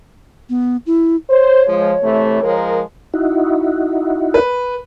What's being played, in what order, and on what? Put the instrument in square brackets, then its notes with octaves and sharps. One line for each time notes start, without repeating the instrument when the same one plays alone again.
[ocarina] B3
E4
[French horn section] C5 [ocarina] C#5
[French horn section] F3 G#3
C3 E3 A3
F3 G#3 A#4
[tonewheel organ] D#4 E4 F#4
[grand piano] B4